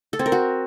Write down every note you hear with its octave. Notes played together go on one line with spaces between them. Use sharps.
A4
C4
A#4
F#4